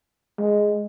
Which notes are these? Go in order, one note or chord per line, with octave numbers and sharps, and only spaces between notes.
G#3